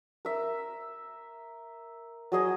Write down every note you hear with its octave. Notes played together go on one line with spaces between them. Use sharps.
A#4 E5
F#3 G#4 D#5 G#5